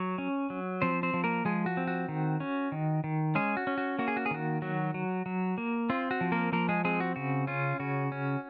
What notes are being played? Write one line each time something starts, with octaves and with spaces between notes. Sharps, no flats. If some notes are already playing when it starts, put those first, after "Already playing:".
Already playing: F#3 C#5
C#4
F#3
F3 C4 C5
C4 C5
F3
A#3 A#4
F3 G#3 G#4
F#4
C4
F#4
D#3
C#4
D#3
D#3
G#3 C#4 G#4
F#4
C#4
F#4
A#3 F#4
G#4
F#4
G#4
D#3 F#4
F#3 F#4
F#3
F#3
A#3
C4 F4
F#4
F3
A#3 A#4
F3 A#3 A#4
G#3 G#4
G#3 C4 G#4
F#4
C#3 F#4
C#4 F4
C#3 F#4
C#4